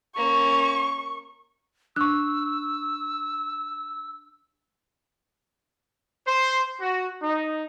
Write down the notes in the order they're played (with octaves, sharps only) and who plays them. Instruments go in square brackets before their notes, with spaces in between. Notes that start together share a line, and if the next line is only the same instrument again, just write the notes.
[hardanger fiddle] A#3 C#4 [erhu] C#6
[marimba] D4 [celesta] C#6 F#6 [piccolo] E6
[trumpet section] C5
F#4
D#4